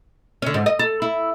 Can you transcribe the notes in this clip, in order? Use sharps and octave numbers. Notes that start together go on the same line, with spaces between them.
D3 C#4
G#2
D#5
A4
E4